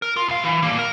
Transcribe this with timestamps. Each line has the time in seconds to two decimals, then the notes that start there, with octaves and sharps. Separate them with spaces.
0.02 A#4
0.16 F4
0.28 C2 F5
0.43 E3
0.62 G3 A#3
0.79 A#4